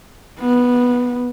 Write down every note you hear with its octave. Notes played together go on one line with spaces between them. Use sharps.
B3